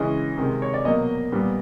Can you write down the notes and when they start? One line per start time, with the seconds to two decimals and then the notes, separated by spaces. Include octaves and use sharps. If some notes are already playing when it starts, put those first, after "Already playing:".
Already playing: C#3 E3 G#3 C#4 D#5
0.37 C3 D#3 G#3
0.62 C#5
0.74 D5
0.85 B2 F#3 A#3 D#5
1.32 A#2 G3 B3